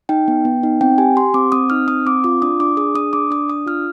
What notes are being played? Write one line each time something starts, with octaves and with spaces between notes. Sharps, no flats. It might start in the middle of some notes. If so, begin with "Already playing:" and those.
D#4 G5
B3
B3
D#4
C4 G5
G4 G#5
G4 C6
C4 D6
C4 D#6
D#4 F6
C4 D#6
C4 D6
F4 D6
D4 D#6
D4 D6
G#4 D#6
D4 D#6
D4 D6
D4 D#6
D4 D#6
F4 F6